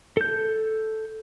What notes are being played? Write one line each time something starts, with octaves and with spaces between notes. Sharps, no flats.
A4 G6